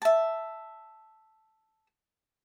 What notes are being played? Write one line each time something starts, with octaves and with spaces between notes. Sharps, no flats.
E5 A5